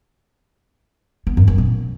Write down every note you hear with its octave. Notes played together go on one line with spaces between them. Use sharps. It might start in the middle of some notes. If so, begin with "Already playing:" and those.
B3
F#2
F#2
A#2